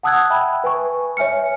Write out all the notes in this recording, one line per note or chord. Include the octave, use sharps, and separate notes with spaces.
F#5 A5 D#6 E6 F#6 G#6
E5 G5 A5 B5
B4 G#5 C#6
C#5 E5 G#5 F6 C#7